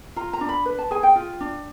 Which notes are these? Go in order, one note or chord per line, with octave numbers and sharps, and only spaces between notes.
F4 A#5
A#5
D4
B5
B4
A5
G#4 G#5
G5
F4
D4